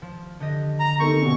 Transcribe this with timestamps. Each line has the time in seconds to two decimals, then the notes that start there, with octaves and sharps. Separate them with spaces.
0.02 F3
0.40 D3 G4 D#5
0.80 A#5
1.00 D#3 C4 A4 A#4 C#6
1.22 B2 C#4